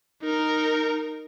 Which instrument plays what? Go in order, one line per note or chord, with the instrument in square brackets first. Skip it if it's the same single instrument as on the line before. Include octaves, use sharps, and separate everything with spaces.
[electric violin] D#4 A#4